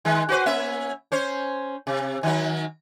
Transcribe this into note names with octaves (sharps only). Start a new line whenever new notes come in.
D#3 G#3
F#4 B4 C5
A#3 C#4 E5
C#4 C5 C#5
C3
D#3 F#3